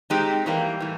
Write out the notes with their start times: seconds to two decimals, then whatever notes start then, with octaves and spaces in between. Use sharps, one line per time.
0.10 G#3 C4 D#4 G4
0.46 E3 G3 A#3
0.81 A2 E3